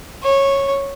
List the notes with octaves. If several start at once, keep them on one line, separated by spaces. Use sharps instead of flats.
C#5